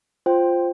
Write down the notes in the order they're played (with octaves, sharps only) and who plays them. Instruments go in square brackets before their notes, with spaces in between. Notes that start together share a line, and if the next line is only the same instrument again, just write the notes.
[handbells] F4 C5 G5